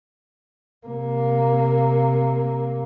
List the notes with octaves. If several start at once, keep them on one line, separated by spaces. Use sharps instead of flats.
C3 A#3